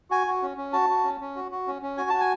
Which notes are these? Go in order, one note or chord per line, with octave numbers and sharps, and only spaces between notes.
F#4 G#5
F#4
C#4
C#4
F#4 A5
F#4
C#4
C#4
F#4
F#4
C#4
C#4
F#4 G#5
F#4 A5
G#5